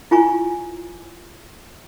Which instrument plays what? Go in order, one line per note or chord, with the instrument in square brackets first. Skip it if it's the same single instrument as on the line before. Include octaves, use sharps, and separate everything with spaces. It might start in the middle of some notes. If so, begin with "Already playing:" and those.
[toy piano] E4 F4 G#5 A#5 C#6